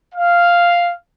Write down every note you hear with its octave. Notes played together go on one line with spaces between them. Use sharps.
F5